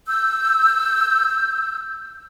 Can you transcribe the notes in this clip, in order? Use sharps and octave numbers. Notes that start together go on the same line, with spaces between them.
E6 G6